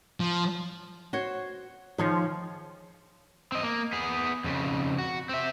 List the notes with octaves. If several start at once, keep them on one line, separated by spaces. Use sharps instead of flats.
F3
F#4 C5 C#5
D#3 F3 G#4 C#5
C4 D#5
A#3
B3 G#4
F2 C#3
F#4
C4 E5